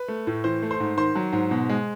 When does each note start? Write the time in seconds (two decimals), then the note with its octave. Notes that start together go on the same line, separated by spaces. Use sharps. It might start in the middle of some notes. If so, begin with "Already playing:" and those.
Already playing: B4 B5
0.08 A3
0.27 A2
0.44 E3 C5 C6
0.63 A3
0.71 C5 C6
0.80 G#2
0.97 D#3 C5 C6
1.15 F#3
1.33 G#2
1.51 B2
1.69 G#3